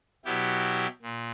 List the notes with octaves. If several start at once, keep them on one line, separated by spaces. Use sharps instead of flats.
B2 F#3 B3 E4 G4
A#2